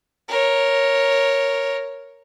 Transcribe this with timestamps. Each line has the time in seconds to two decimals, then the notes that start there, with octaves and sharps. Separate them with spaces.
0.28 A#4 C#5